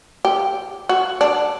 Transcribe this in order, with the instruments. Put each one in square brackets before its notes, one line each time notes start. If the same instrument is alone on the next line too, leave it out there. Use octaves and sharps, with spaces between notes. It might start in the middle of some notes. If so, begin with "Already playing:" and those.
[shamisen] G4
F#4
D4